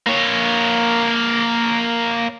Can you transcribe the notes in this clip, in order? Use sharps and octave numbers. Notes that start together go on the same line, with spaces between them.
A#3 C#5